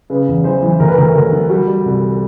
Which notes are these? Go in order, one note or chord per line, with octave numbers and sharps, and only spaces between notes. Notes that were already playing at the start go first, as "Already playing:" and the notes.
C#3 B4
E2
E3 C5
E3
D2 A#4
B4
D2 A#4
D2 A#4
D3
G3 F#4
G3
C2